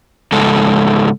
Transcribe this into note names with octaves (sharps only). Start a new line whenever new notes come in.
G#2 C#3 G#3 A4